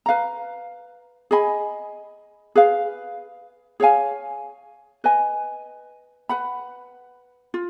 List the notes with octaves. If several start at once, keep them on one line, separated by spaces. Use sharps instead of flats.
B4 F5 A#5
G#4 D#5 G#5 B5
G#4 B4 F5
G#4 C#5 F5 G#5
B4 D#5 G#5
B4 F#5 B5
F4